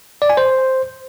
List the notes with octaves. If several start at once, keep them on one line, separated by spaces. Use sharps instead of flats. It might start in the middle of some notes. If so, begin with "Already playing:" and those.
D5
G#5
C5